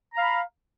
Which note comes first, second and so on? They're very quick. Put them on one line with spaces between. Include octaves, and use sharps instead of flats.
A#5 F5 B5